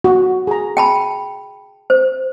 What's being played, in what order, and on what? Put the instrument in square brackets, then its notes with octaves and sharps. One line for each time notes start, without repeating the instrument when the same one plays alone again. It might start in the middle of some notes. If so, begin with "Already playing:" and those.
[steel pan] F#4
G#4 A#5
[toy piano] G5 A5 B5
C5